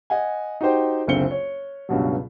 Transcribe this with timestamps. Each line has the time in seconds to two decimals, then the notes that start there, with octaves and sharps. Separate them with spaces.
0.10 D#5 F#5 G#5
0.61 D#4 F#4 G4 C5 G5
1.07 F#1 C#2 D3 C4 C#7 G7
1.31 C#5
1.89 C#2 G2 B2 F#3